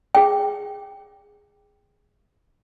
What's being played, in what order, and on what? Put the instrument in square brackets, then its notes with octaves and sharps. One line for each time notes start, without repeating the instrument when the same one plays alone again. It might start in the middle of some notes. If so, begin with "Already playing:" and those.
[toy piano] G#4 G5